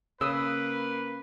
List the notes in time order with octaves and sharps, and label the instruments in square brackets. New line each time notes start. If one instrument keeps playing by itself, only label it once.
[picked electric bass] C#3 [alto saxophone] A#3 [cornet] B4 [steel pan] D#6 E6